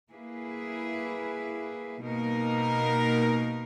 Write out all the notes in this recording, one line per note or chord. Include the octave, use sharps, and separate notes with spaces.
A#3 E4 G#4 B4
B2 A#3 D#4 A#4